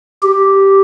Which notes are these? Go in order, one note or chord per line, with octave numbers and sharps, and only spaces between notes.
G4